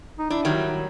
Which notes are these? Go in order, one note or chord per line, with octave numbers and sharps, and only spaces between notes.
D#4
D4 E4
D#3 F#3 G3